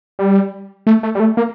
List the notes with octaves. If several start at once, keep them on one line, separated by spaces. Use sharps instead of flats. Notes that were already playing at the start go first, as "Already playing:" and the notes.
G3
A3
A3
G3
A3
A#3